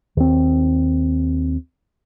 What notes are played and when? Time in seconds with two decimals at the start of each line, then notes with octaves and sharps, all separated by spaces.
0.17 D#2 C4